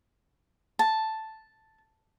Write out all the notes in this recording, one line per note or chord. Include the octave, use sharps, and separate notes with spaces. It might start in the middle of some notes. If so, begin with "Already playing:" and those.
A5